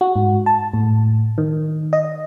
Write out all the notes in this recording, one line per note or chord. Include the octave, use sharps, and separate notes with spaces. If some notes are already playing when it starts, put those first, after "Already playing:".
F#4
G#2
A5
A2
D#3
D#5